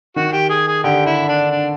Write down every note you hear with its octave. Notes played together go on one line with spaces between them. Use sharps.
D#3 F#4
G4
G#4
G#4
D3 G4
E4
D4
D4